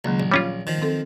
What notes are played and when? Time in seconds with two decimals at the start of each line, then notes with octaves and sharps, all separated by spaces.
0.05 C#2 D#3 F#3 A#3
0.20 A#1
0.32 G3 C#4 F4 C#5 F5
0.67 D#3 F3
0.82 C4 A4